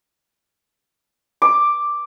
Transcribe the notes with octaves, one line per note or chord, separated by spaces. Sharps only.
D6